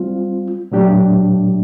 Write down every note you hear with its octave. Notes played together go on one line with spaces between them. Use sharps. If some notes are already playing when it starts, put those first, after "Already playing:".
Already playing: G3 C4 F4
A#2 F#3 A3 D4 G4